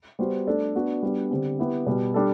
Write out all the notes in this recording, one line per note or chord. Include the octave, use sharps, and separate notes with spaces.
G3 B3 F#4 C5
A3 D4 A4 D5
B3 D4 F#4
G3 B3 D4
D3 G3 C4
B3 E4 G4
B2 G3 B3
G3 D4 A4